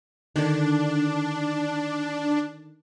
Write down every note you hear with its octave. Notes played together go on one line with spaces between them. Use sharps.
D3 D#3 D4